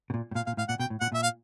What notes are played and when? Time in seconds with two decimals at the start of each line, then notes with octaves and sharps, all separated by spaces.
0.10 B2
0.14 A#2
0.31 A2
0.35 A#2 F5
0.46 A#2 F5
0.57 A2 F5
0.68 A#2 F#5
0.79 B2 G5
0.90 A2
1.00 A#2 F#5
1.12 A#2 E5
1.23 F5